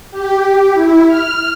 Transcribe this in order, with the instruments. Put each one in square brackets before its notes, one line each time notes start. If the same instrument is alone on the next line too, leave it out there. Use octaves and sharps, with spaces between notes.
[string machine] G4
E4
F6